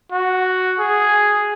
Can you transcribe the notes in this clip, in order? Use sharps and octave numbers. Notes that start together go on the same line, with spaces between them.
F#4
G#4